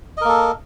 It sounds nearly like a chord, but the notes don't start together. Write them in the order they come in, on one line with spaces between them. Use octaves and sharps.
D#5 A#4 A#3 A4